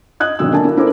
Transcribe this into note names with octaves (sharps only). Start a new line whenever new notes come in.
D#5 D#6 F#6 G#6
G#1 B2 D3 F#3 D#6 E6
D3 A#3 G#5 A5
A#3 E4
D4 E4 A4 A#4 C5 D6